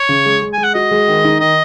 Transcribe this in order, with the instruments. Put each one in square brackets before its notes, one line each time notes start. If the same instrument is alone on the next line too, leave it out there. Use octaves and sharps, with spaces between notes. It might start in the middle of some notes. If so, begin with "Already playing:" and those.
Already playing: [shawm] C#5
[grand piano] C#3
G#3
G#3
[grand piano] G#3 [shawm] G#5
[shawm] F#5
[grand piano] F#4 [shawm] D#5
[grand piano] G#3
D#3
D#4
[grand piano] D#3 [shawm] D#5